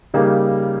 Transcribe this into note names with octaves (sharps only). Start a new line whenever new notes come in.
C#3 G3 A#3 D#4 G4